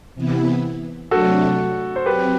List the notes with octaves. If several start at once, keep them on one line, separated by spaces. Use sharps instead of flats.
C3 E3 B3 E4
C3 F#3 A3 D4 F#4 A4
C5
F#3 C4 G4 B4